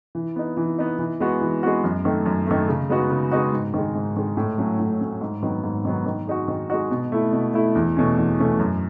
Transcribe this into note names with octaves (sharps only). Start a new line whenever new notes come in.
E3
B3 D#4
E3
B3 D#4
E3
G#3 B3 F#4
E3
G#3 B3 F#4
F#2
D#3 A3
F#2
D#3 A3
C#3
G#3 B3 D#4 F#4
C#3
G#3 B3 D#4 F#4
G#2
D#3 G#3
G#2
D#3 G#3
A2
F#3 A3 C#4
A2
F#3 A3 C#4
G#2
D#3 F#3 B3
G#2
D#3 F#3 B3
D#3
G#3 D#4 F#4
D#3
G#3 D#4 F#4
B2
A3 E4
B2
A3 E4
E2
B2 A3 C#4
E2
B2 A3 C#4
F#2